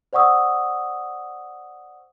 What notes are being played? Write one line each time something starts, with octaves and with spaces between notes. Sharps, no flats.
C5 D5 F#5 C#6 D#6 E6